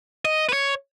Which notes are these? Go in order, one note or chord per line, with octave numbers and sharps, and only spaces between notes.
D#5
B4
C#5